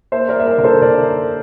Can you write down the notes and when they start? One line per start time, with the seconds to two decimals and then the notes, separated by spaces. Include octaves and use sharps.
0.12 A#3 C5 E5
0.29 A#4 D5
0.35 A#3 E5
0.47 A#4 D5
0.58 D3 A#4
0.64 A4 C5
0.82 D3 A#4 D5